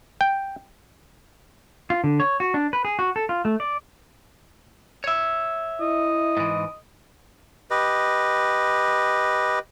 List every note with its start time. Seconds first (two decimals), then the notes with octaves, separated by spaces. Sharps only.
0.21 G5
1.90 F4
2.04 D3
2.20 C#5
2.40 F#4
2.54 D4
2.73 B4
2.85 G#4
2.99 F#4
3.16 A4
3.29 F4
3.45 A3
3.60 D5
5.04 C#5 E5
5.80 E4 D#5
6.37 G#2 E3
7.71 G4 B4 D#5